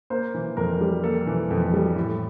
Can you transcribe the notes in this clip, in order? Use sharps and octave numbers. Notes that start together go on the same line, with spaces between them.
A#3 C5
E3
F2 A#4
G3
A#3 A4
E3
F2
G3
A2